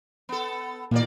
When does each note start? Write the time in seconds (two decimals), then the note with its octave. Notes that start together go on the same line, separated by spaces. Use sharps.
0.29 B3 A4
0.91 D#2 A#2 A#3 D5